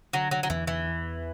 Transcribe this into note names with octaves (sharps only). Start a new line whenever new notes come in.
D3 F#3
F#3
F#3
E2 E3
E3
E2